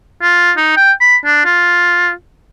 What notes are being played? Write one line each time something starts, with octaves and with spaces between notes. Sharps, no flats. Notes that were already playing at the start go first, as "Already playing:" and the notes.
F4
D#4
G5
B5
D4
F4